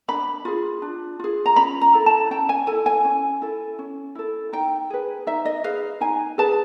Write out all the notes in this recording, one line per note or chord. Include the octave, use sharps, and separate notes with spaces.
D4 B5
F4 G#4
D4
F4 G#4
A#5
C#4 B5
A#5
E4 A4
A5
C#4 G5
G#5
E4 A4 G#5
G#5
C#4
E4 A4
C#4
E4 A4
D#4 G5
G#4 B4
D#4 E5
D#5
G#4 B4 F5
D#4 G#5
G#4 B4 A5